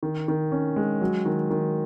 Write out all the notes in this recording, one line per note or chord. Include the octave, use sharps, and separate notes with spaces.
D#3
D#3
C#4
G#3
F#3
D#3
D#3